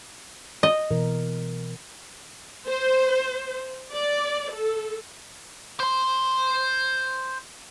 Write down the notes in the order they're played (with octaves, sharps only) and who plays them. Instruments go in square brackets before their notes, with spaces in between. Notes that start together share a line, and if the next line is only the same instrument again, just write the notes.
[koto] D#5
[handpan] B2 E3 A#4
[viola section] C5
D5
A4
[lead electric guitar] C5 C6